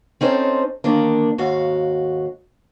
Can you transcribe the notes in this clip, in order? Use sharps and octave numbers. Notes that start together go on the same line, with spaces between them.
C4 C#4 D#4 A4 C5
D3 D#3 A#3 D4
D#2 G#2 F#4 F5